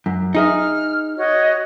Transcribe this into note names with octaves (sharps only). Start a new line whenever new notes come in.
F#2
D#4 G#4 E5 F6
F#4 C#5 D#5